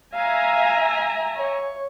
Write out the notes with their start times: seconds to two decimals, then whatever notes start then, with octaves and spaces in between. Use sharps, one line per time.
0.14 E5 F5 G#5 A#5
1.37 C#5